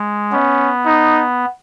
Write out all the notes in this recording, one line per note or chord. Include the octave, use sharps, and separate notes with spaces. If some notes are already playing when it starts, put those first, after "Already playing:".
Already playing: G#3
B3 C#4
D#4